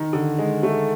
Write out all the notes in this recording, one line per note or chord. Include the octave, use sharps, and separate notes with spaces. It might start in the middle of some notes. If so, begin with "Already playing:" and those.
Already playing: D#3
D3
G#3
A3